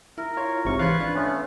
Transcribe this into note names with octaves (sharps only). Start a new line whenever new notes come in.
E4 A#4
F4 C#5
G#1 G#2 C3 C#6
E3 F4 B4 F5 C#6 F#6 G#6
D4
A3 B3 C#4